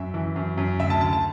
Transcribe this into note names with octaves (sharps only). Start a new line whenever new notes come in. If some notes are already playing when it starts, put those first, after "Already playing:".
Already playing: F#2 E5
E3
F#2
F#2
D2 E5
A5
D2 A5
A5